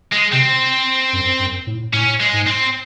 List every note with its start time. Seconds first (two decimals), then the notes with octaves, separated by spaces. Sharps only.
0.13 G#3
0.33 C3 C4
1.13 F#2
1.39 F#2
1.67 A2
1.93 A2 C#4
2.20 G#3
2.33 G#2
2.47 C4